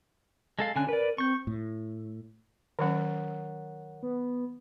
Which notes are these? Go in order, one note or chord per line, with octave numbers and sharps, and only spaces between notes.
G#3 A4 F5
D3 C#4 G#5 F#6
A#4 B4 D5
C4 C#6 G6
A2
D#3 F#3 C#4 A#4 C#5 F#5
B3